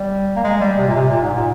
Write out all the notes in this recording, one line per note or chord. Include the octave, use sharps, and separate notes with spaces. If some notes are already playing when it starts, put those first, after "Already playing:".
Already playing: G3
A#3
G#3
G3
C3
A#2
C3
A#2
G#2
A#2